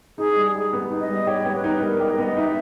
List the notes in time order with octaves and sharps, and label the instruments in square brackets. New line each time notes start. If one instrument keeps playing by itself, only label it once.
[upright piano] D#4 [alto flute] G#4
[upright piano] G3
[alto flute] G#4
[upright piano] G4
B3
D#4
[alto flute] D#5
[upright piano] G3
[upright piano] G4 [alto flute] C#5
[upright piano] B3
[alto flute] B4
[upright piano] D#4
[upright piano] G3 [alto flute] A#4
[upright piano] G4
[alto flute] D#5
[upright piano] B3
[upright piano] D#4 [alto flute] E5